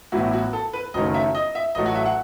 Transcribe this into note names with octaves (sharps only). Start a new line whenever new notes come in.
A1 A2 F#3 B3 E4 F#4
F#4
A4
B4
F#1 F#2 D#3 F#3 A3 D#5
E5
D#5
E5
A1 A2 F#3 A3 D#5
F#4
E5
F#5